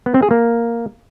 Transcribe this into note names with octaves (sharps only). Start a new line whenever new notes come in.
B3
C4
G#4
A#3